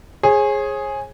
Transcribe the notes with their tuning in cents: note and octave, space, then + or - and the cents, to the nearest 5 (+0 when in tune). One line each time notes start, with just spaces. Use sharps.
G#4 +0 C#5 -40